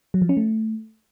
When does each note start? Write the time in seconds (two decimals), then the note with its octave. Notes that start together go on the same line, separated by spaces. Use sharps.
0.14 F#3
0.22 F3
0.29 C#4
0.37 A3